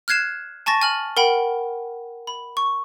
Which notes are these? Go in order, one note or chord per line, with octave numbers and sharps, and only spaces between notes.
F6 F#6 G#6 C7 E7
G#5 A5 C#6 A6 A#6
G#5 F6 F#7
A#4 F#5 G5 B5
B5
C#6